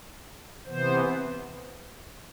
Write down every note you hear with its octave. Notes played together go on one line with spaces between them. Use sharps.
C3 E3 B3 C5